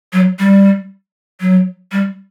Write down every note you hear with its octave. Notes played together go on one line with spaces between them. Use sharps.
F#3
G3
F#3
G3